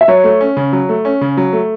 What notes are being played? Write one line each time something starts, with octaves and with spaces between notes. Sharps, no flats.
E5
F#3 C#5
A3
C#4
C#3
F#3
A3
C#4
C#3
F#3
A3